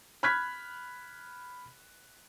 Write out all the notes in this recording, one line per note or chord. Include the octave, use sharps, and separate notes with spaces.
B5 F6 F#6 G#6 B6